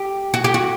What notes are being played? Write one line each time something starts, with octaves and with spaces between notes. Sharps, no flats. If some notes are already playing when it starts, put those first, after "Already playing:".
Already playing: G4
F#4
G4
F#4